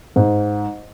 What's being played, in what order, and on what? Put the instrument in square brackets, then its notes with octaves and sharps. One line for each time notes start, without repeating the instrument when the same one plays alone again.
[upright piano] G#2